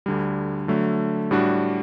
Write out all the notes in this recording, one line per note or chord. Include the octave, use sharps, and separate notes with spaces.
D2 D3 G3
D3 F#3 A3
A2 G3 D4 F#4